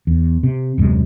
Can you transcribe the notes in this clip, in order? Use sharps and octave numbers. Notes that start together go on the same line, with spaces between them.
E2
C3
D#1 F#2 C3 G#3